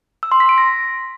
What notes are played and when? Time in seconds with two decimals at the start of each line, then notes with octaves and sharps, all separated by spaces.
0.23 E6
0.32 C6
0.40 B6
0.49 D7
0.58 A#6